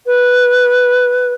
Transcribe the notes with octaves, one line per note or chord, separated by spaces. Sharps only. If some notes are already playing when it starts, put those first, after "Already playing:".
B4